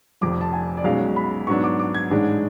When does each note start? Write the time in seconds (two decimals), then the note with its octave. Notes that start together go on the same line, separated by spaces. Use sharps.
0.21 F1 F2 F3 D6
0.41 A5
0.53 G#5
0.77 D5
0.84 B1 B2 G#3 C#4 F5
1.16 B5
1.47 G#2 F#3 B3 D4 C#6
1.64 D6
1.79 D6
1.94 G#6
2.11 A1 G#2 G#3 D4